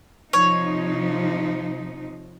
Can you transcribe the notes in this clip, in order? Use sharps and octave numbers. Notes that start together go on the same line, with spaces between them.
C3 F3 D#4 C#5